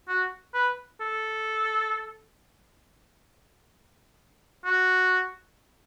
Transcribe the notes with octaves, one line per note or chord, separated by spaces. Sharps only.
F#4
B4
A4
F#4